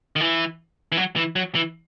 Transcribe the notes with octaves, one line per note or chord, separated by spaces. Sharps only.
D#3
E3
E3
F#3
E3
F#3
E3